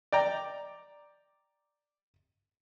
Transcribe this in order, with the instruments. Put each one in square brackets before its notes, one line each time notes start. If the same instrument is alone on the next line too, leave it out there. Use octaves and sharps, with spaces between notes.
[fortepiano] D5 G5 A#5